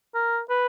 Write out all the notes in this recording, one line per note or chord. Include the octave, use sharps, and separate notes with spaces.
A#4
B4